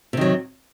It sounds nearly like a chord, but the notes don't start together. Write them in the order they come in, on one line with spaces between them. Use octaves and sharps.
C3 D#3 F#3